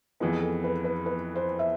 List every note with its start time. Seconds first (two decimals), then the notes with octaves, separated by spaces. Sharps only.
0.20 F2 E3 G#3 B3 F4
0.43 A4
0.64 B4
0.84 B4
1.06 B4
1.35 C5
1.59 E5